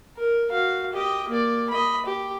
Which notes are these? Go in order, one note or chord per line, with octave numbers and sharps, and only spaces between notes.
A#4
F#4 F5
G4 D#5
A#3 D5
D#5 B5
G4